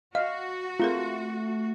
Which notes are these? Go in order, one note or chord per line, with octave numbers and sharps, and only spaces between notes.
F#4 D#5 F5
A3 C4 F4 G#4 A#4